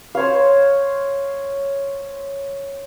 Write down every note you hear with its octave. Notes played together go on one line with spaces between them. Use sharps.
C5 C#5 F5